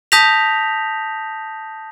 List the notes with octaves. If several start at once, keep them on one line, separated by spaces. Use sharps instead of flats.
A5 D#6 G6 A#6 B6 F7